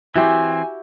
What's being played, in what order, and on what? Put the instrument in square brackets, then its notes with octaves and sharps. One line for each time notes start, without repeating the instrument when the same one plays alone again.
[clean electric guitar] E3 C4 [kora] E4 F#4 G4 [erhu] G#5